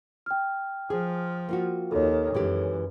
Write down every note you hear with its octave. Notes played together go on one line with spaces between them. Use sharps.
G5 F6
F3 G#4
A#3 F4 F#4
D#2 D#3 A4 C#5
F#2 E3 G#3 G4